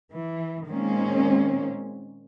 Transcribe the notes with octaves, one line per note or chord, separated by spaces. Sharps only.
E3
A#2 D#3 G#3 A#3 C4 C#4